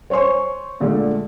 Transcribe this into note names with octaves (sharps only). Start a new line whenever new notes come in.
C5 C#5 G#5 C6 C#6
A#2 D3 G#3 A3